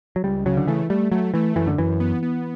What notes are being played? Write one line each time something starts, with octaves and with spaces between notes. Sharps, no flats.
F#3
C#2 G3
C#3 F#3
D3
E3 A3
G3 A3
F#3 A3
E3 A3
F#2 E3
D3
F#2 E3
B3
B3